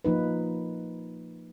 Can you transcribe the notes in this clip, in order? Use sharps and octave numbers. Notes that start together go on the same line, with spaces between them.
F3 A#3 D#4 B4